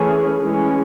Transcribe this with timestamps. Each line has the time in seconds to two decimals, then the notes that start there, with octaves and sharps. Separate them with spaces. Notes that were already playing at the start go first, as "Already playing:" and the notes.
Already playing: E3 A3 C#4 G#4
0.42 E3 G#3 C#4